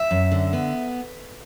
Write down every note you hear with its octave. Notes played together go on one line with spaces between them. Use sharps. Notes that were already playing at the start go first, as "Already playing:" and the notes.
Already playing: E5
F#2
D3
B3